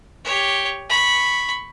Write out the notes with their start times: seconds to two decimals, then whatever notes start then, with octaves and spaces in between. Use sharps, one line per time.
0.25 G4 C#5
0.89 B5 C#6